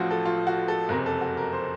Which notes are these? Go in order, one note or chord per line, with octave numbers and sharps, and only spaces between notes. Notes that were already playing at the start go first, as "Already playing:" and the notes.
Already playing: A1 A2 F3 F4 F#4
A4
F4
F#4
A4
F#1 F2 C3 A#4
A4
F#4
A#4
C5